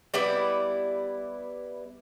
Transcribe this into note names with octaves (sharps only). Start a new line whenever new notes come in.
G3 B3 E4 D5